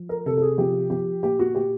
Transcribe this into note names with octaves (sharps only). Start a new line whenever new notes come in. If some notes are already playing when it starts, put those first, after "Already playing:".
Already playing: F3
A#4
C3 A4
A4
G#4
F3 G4
F3 G4
A#2 G4
F#4
A#2 G4